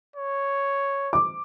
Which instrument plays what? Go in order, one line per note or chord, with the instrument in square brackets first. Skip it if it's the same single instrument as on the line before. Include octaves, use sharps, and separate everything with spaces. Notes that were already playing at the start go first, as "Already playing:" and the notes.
[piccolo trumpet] C#5
[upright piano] D6